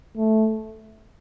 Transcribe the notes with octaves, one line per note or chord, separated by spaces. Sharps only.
A3